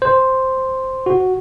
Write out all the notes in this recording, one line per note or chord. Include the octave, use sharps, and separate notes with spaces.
C5
F#4